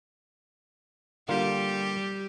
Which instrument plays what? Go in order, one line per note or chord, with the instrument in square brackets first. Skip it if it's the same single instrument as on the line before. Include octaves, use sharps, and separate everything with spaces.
[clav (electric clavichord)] D3 A#3 F4 [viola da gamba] G3 G4